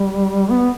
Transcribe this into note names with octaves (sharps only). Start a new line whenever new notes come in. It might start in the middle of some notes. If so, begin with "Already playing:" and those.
Already playing: G3
B3